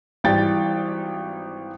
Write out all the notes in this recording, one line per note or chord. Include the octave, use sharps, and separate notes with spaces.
G#1 E3 G3 G4 G5 A6